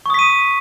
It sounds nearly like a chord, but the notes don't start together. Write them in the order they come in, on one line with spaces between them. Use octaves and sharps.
C#6 D#6 B6 D#7